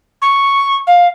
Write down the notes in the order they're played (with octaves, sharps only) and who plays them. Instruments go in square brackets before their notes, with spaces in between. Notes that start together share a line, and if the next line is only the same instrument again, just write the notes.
[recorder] C#6
F5